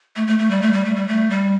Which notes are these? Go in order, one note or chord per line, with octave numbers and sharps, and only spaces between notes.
A3
A3
A3
G3
A3
G3
A3
G3
A3
G3